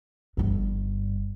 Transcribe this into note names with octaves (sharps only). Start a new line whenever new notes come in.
G1 G2